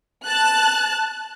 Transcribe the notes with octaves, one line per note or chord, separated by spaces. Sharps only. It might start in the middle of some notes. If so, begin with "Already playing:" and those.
A5 F#6